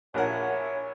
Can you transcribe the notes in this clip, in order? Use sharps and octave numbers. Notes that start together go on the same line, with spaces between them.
A#1 E4 A#4 C#5 F#5 G#5